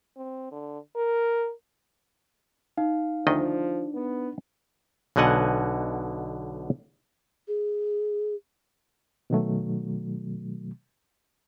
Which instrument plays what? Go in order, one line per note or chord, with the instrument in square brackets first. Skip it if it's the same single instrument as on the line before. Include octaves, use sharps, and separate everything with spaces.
[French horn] C4
D3
A#4
[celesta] D#4 [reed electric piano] F5
[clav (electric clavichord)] D2 D#3 D#5 [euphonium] F3 [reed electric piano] D4
[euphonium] B3
[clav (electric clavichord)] B1 B2 D3 D#5 F#5 G#5
[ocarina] G#4
[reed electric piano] B2 D#3 F#3 A3